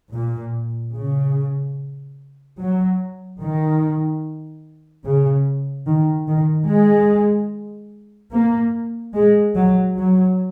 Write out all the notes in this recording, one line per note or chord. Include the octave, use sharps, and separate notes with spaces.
A#2
C#3
F#3
D#3
C#3
D#3
D#3
G#3
A#3
G#3
F#3
F#3